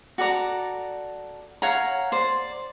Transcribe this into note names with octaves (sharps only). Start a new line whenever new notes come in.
F#4 A4 D5 A#5
C#5 F5 F#5 A#5
C5 D5